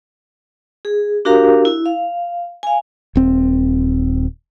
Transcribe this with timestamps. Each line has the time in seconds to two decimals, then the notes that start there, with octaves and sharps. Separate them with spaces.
0.85 G#4
1.25 D4 F#4 G4 A#4 F5 A#5
1.65 E4
1.86 F5
2.63 F5 G#5
3.15 D#1 C4